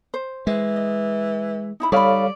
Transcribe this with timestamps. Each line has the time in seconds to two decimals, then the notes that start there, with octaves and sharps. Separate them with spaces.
0.14 C5
0.47 E3 G#3
0.76 D#5
1.80 D#4 E4 B5
1.92 G3 D#4 A4 C#5 D5 F5 B5